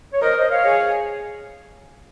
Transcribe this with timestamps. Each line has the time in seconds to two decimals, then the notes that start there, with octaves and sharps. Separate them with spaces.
0.14 C#5
0.22 A#4 C5 D#5
0.37 C5 D#5
0.51 C#5 F5
0.65 G#4